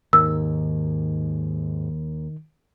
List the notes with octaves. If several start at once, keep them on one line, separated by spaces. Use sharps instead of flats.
D#2 G#2 D#3 E6